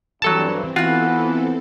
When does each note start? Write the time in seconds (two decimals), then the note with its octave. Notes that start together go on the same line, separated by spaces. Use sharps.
0.22 G2 E3 F#3 C4 A4 A5
0.76 E3 B3 C4 F4 F#4 A4 F#5